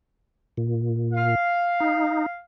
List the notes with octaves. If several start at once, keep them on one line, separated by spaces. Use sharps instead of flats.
A#2
F5
D#4